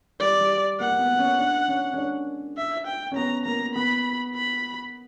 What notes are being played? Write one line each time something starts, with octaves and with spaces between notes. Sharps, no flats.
G3 D5
G3
A#3 F#5
A#3
B3
C#4
D4
C#4
C#4
D4
E5
G5
C#4
B3 A#5
A#3 A#5
B3 B5
B5